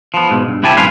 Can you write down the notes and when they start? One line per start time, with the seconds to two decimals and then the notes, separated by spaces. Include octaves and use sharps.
0.14 F3 B3
0.30 G#2 B2
0.48 G2
0.63 C3 E4 G4 G#5 A5
0.76 B1 G#2 C#4 F4 B4 F5